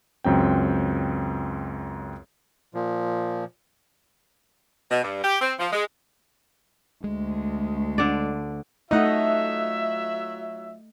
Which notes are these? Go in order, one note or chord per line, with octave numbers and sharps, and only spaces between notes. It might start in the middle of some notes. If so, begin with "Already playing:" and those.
C#2 F#2 C4 G5
A#2 F3
B2
G2
G4
C4
F3
G#3
D2 G#3
D3 D5
F#3 A3 D#4 F4 D#5 E5 F#5